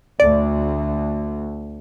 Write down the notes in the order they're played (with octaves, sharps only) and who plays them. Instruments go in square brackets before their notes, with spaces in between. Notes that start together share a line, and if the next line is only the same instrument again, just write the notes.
[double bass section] D2 [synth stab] D5